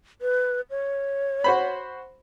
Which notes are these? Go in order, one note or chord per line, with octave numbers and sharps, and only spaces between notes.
B4
C#5
F#4 C5 B5